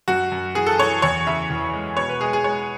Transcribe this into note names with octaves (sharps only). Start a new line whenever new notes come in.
F#2 F#4
F#2
E3 G#4
A4
E3 C#5
E2 C#5
C#3 E5
E2
G#3
B2 C#5
B4
G#3 G#4
G#4
G#3 C#5